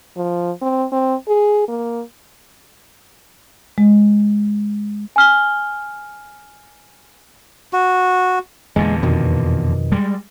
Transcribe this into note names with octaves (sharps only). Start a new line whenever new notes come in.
F3
C4
C4
G#4
A#3
G#3
G#5 F6 G7
F#4
E2 A#2 D3 G#3
F2 B2 D#3
G3 G#3